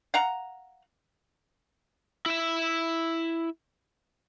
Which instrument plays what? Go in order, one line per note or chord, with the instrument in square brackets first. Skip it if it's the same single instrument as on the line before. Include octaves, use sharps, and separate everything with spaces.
[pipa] F5 F#5 A#5
[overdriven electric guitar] E4 E5